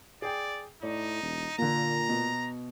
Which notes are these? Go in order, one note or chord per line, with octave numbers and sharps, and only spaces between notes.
G#4 D5 G5
A2 D#4 D5
E1
A#2 D3 A#3 A#5
B2